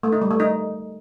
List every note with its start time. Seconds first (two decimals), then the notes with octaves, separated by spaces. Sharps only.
0.03 A3
0.12 D#4
0.22 G3
0.31 A3
0.40 D#4